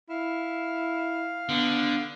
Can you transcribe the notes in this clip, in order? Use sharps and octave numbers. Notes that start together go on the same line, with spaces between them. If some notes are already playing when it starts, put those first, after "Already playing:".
E4 F5
D3 B3